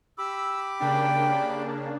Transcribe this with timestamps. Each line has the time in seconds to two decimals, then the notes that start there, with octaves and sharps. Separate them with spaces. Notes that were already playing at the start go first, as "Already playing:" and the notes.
0.18 G4 B5 D6 E6
0.80 C#3 A#3 D4 G5